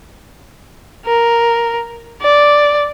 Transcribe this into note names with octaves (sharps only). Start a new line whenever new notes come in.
A#4
D5